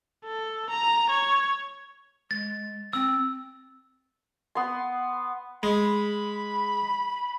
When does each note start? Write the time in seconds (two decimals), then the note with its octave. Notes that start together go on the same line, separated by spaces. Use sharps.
0.25 A4
0.70 A#5
1.10 C#5
2.31 G#3 A6
2.93 C4 E6
4.55 B3 C6
5.63 G#3 B5